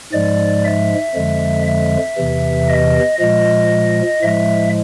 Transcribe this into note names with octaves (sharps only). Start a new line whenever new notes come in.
G#2 F3 G#3 D5
E5
F2 D3 F3 G#3
E5
E2 C3 E3
D#5
A#2 F3 G#3 D#5
A2 F3 G#3 E5